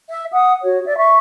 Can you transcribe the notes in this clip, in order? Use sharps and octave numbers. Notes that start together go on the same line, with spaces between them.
E5
F#5 D#6
F#4 C#5
D5 E5
E5 C#6